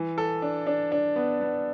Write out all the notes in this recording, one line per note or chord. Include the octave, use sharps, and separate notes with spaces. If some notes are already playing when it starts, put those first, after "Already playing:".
Already playing: E3
A4
D4
D4
D4
B3
B3